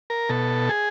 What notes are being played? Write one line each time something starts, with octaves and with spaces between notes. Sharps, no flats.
A#4
B2 A4
G#4